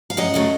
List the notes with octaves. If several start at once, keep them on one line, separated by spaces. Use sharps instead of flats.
F5
F#2 D#5 F#5
C#3 F#3 A3